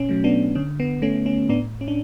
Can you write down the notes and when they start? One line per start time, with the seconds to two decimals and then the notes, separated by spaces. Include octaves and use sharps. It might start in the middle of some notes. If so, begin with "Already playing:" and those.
Already playing: B2 C#4
0.09 F#3 A3
0.24 B3 D4
0.55 D3 C#4
0.80 B3
1.02 A3 C#4
1.26 C#4
1.49 A2 B3 D4
1.81 C#4
1.88 D4